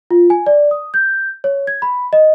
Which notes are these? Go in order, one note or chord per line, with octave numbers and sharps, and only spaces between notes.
F4
G#5
D5
D#6
G6
C#5
G#6
B5
D#5